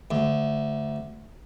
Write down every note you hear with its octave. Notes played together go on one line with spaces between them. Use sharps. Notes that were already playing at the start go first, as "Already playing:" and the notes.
D2